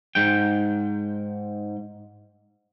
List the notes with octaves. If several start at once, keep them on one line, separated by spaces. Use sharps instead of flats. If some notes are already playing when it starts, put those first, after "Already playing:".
G#2 G5